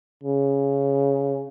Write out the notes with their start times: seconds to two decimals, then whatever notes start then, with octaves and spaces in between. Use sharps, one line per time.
0.24 C#3